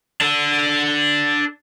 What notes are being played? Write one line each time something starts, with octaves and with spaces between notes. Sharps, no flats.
D4 A4